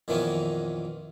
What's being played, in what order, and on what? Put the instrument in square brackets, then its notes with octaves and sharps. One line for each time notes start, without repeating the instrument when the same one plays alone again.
[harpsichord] F2 A#2 D#3 E3 B3 C#4